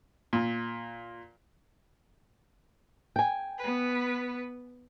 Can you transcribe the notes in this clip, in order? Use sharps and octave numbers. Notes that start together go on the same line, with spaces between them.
A#2
G5 G#5
B3 B4